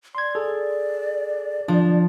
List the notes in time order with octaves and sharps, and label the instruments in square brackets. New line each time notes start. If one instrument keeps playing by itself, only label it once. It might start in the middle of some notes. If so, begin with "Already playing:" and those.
[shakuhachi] D5 [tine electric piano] C6 G#6
[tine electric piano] G#4 A4
[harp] F3 [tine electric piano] D4